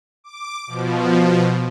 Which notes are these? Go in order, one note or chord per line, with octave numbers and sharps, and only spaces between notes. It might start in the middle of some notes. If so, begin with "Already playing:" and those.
D6
B2 F3